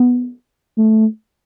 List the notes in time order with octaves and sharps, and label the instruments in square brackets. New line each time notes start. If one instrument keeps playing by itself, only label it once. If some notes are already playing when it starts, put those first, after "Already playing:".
Already playing: [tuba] B3
A3